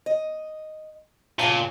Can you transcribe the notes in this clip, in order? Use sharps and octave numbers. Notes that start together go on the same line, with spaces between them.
D#5
A#2 C#3 F5 A5